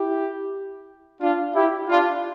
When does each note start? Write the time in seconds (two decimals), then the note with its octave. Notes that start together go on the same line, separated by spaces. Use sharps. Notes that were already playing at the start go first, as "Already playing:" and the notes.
Already playing: E4 G4
1.21 D4 F4
1.54 E4 G4
1.88 D4 F4